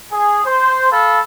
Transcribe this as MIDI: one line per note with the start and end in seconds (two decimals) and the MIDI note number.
0.11 0.42 68
0.45 0.89 72
0.91 1.20 69
0.91 1.20 77
0.91 1.20 83